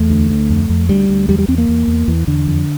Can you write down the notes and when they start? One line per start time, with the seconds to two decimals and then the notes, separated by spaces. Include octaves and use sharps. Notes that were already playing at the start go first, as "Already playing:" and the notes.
Already playing: E2 A3
0.10 D2
0.30 D2
0.50 F2
0.69 F2
0.89 D2 G3
1.09 D2
1.28 E2 G3
1.39 G3
1.48 E2 C4
1.58 A#3
1.69 E2
1.88 E2
2.08 E2 E3
2.27 E2 D3
2.47 F2